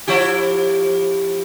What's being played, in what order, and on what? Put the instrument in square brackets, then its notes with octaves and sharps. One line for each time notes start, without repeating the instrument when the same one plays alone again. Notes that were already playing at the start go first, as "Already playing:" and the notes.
[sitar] F3 E4 G4